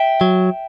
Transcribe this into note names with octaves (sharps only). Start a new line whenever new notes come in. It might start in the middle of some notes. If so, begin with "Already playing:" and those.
Already playing: E5 G5
F#3